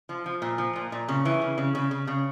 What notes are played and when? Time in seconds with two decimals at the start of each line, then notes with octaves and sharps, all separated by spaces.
0.09 F3
0.26 F3
0.42 A#2
0.58 F3
0.76 A#2
0.92 A#2
1.08 C#3
1.25 E3
1.42 C#3
1.58 C#3
1.75 C#3
1.91 C#3
2.07 C#3